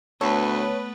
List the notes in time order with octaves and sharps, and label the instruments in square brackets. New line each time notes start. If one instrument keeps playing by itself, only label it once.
[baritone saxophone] D2 [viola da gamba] A3 B3 B4 [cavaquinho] A4 [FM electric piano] C#5